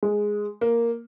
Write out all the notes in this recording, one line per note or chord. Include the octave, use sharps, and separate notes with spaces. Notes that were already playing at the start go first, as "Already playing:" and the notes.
G#3
A#3